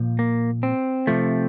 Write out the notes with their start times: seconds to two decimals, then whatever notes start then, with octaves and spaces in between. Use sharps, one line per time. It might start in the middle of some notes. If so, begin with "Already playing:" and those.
Already playing: A#2 F3
0.19 A#3
0.63 C4
1.07 C3 F3 A3